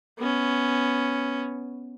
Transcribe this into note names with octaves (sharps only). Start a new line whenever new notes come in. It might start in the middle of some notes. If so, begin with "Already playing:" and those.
B3 C#4